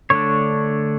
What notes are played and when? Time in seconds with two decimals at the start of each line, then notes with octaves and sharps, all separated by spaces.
0.10 D3 A3 D4 C#5